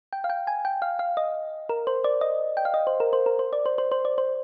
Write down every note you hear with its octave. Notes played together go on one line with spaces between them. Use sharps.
G5
F5
G5
G#5
G5
F5
F5
D#5
A#4
C5
D5
D#5
G5
F5
D#5
C5
A#4
C5
A#4
C5
D5
C5
C5
C5
D5
C5